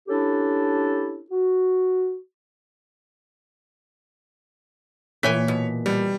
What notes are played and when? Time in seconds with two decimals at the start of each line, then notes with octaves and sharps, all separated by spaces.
0.08 C#4 D4 E4 G4 A4
1.31 F#4
5.23 A#2 E3 C#5 G5 G#5 B6
5.48 B2
5.86 B2 G3